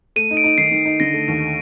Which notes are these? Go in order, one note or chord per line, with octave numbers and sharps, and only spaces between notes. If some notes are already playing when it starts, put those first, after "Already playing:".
A3 D#7
D#4
D7
D#4
D#3 C7
D#3
D#4
D3 A#6
A3
D#2